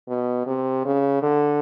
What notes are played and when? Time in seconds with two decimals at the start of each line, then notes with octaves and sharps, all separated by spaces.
0.08 B2
0.46 C3
0.85 C#3
1.23 D3